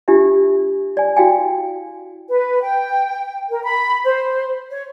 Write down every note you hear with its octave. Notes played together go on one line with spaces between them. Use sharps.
D4 F4 G4 E5
D5 G#5
E4 F#4 F5 G5 G#5
B4
G5
A#4
B5
C5
C#5